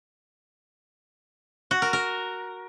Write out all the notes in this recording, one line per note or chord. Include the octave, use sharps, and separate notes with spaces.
F#4
A#4
A#4